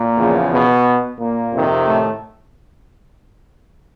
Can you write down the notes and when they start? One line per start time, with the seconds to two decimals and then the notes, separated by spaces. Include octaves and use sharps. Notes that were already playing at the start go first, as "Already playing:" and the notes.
Already playing: A#2 A#3
0.17 E2 C#3 F3
0.51 B2 B3
1.18 A#2 A#3
1.53 F2 C3 D#3
1.87 A2 A3